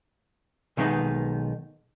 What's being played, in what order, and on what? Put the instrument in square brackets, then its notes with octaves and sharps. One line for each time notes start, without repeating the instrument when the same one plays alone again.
[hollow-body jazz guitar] B1 D#3 G#3 B3 D#4